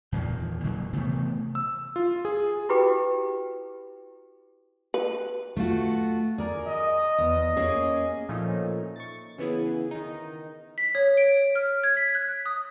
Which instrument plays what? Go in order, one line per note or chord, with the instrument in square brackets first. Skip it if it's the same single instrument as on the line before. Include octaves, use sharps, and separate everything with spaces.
[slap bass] E2 A#2 D#3 A#3
A#2 D#3 F#3
C3 E3 A3 B3
[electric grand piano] E6
F4
G#4
[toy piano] E4 F#4 G4 B4 G5 D6
[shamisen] B4
[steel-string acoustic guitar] A3 F4 F#4
[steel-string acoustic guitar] G#4 A#4 [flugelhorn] D5
[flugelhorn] D#5
[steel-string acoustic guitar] E2
A#3 C#4 G#4
[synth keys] A#2 F3 A3 C#4 D#4
C#6 A6
C#3 E3 B3 E4 G#4
D#3 D#4
[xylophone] B6
C#5
D7
F6
G#6
B6
F#6
D#6